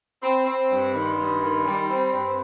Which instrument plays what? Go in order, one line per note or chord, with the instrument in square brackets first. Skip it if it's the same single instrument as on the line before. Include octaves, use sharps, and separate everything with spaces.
[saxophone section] C4 [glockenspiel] B5
[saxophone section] C4
G2
[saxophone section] D#3 [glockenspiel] B5
[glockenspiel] C6
B5
[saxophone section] G2 [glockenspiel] C6
[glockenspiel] B5
C6
B5
[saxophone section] D#3
[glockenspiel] C6
B5
[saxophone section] G3 [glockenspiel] G#5
[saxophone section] C4 [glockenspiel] B5
[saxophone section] G2 [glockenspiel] B5